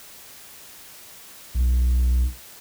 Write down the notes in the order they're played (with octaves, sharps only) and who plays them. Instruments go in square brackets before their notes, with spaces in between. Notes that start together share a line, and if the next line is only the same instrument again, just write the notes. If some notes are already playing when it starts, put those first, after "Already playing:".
[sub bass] B1